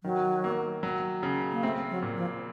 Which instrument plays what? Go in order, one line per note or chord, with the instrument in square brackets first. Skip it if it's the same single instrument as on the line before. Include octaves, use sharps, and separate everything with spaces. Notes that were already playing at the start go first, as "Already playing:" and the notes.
[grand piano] D#3 [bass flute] F#3
[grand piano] A#3
F#3
C#3
[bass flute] A#3
[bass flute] A3 [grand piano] C4
[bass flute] F#3
[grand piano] A#2
[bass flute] F3